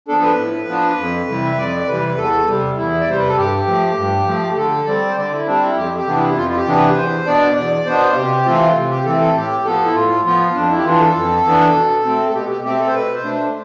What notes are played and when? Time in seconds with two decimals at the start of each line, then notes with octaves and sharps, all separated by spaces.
0.08 F3 B3 D4 A4
0.23 B4
0.37 A2
0.68 F3 B3 D4
0.98 F2
1.28 C3 E3 G3
1.45 E5
1.58 F2 D5
1.88 C3 E3 G3 B4
2.17 E2 A4
2.47 C3 G3
2.77 E2 E4
3.01 D5
3.07 C3 G3 C5
3.19 B4
3.28 A4
3.37 G2 G4
3.67 F3 A3
3.97 G2
4.27 F3 A3
4.52 G4
4.57 D3 A4
4.87 G3 C4 D5
5.10 C5
5.17 D3 D5
5.32 E4
5.46 G3 C4 D4
5.62 E4
5.76 F2 G4
5.97 G4
6.06 C3 E3 B3 D4
6.17 E4
6.36 F2 F4
6.50 F4
6.56 G4
6.66 C3 E3 B3 D4
6.76 B4
6.96 E2 C5
7.26 B2 B3 D4 D5
7.56 E2 D5
7.86 B2 B3 D4 C5
8.11 F4
8.15 C3 G4
8.45 E3 A3 C4 F4
8.76 C3
8.90 G4
9.05 E3 A3 C4 A4
9.20 A4
9.35 A2 G4
9.65 F3 B3 A4
9.85 E4
9.95 A2 F4
10.25 F3 B3 F4
10.55 F2 D4
10.70 E4
10.78 G4
10.85 E3 B3 D4 F4
11.00 A4
11.15 F2
11.45 E3 B3 D4
11.75 B2
12.05 A3 C4
12.29 A4
12.34 B2 G4
12.49 G4
12.64 A3 C4 G4
12.79 A4
12.88 C5
12.94 B2 B4
13.14 C5
13.24 A3 D4
13.34 C5